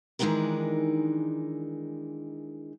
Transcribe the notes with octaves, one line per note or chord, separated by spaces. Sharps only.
D#3 E3 G#3 D4 D#4 A#4